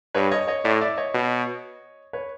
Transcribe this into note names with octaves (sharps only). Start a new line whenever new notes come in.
G2 B4 C#5
C#5 D#5
C#5 D#5
A2 D5 E5
D5 E5
C#5 D#5
B2
B4 C#5